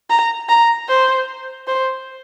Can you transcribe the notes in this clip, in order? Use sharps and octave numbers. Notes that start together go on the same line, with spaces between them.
A#5
A#5
C5
C5